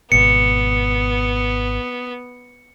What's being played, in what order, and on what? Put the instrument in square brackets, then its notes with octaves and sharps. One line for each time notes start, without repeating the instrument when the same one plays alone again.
[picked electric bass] G#1 B2 [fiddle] B3 [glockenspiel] C#7